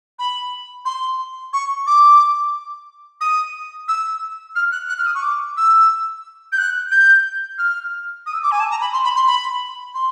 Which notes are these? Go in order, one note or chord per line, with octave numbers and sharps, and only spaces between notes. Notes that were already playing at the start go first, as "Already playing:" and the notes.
B5
C6
C#6
D6
D#6
E6
F6
F#6
F#6
F6
D#6
C#6
D6
E6
G6
F#6
G6
F6
D#6
E6
D6
G#5
A5
A#5
B5
C6
B5
C6
B5
C6